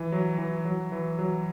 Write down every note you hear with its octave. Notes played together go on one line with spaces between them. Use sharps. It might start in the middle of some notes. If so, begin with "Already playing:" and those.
Already playing: E3
F#3
E3
F#3
E3
F#3